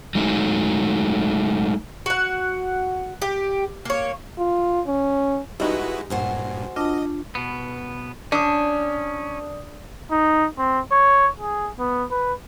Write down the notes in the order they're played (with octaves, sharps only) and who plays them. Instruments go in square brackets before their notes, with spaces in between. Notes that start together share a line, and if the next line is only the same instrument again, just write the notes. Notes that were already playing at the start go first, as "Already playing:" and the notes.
[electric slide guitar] F#3 G#3 A3 D#4
[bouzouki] F#4 F#5
G4
A#3 C#5
[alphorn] F4
C#4
[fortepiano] G3 D#4 [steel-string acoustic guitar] G#3 B3 [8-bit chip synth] E4 F#4 B4
[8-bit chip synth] G2 A#2 [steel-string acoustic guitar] F#4 C5 G#5
[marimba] D4 F4 A5 [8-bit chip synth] D#5
[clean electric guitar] B2 B3
[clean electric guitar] C#4 [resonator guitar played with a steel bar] D4 [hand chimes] D5 D#6
[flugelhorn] D#4
C4
C#5
G#4
B3
B4